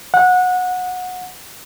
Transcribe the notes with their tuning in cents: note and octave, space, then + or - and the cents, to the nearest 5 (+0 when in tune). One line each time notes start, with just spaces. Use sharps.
F#5 -20